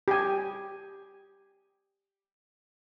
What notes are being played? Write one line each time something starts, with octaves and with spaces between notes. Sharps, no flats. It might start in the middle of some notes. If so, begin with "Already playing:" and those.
G4 G#5